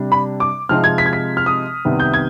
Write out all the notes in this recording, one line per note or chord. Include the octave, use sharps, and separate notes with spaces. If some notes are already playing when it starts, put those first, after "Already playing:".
Already playing: C3 G3 D4
B5
D6
C3 F3 G#3 C4 D#4 F6
G#6
B6
G#6
B6
F6
D#6
C2 C3 D#3 B3
G6
G#6